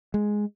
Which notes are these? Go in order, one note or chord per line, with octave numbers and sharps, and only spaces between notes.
G#3